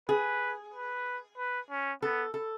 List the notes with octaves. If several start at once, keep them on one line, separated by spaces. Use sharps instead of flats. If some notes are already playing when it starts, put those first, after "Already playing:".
G#4 B4
B4
B4
C#4
B3 A4
A4